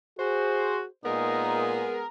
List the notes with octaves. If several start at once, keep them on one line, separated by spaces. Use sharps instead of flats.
F#4 G#4 C5
A#2 G#3 B3 D#4 G#4 A#4